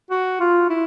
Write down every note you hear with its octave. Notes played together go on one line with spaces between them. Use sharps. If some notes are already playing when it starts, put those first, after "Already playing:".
F#4
F4
E4